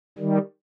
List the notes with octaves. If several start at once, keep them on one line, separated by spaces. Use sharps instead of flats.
D#3 G3